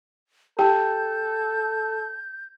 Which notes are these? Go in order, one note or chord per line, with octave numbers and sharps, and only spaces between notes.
G4 A4 G5 A5 G6